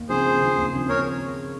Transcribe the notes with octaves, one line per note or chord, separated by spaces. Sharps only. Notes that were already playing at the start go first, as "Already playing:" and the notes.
Already playing: D#2
C#3 F3 C4 G#4 C5
D#2
C#3 F3 C4
D#2
C#3 F3 C4
D#2 A#4 C#5